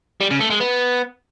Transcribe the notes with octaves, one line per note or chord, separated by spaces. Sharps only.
G3
C#3
A3
G#3
B3